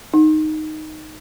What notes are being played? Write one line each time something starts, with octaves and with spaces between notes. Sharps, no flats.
D#4